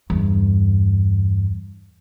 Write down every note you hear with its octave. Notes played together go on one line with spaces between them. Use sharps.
E2 G2